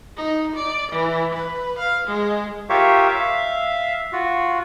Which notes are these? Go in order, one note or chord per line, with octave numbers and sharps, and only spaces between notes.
D#4
D5
E3
B4
F5
G#3
F4 G4 A#4 C#5 E5 F5
E5 F5
F4 F#4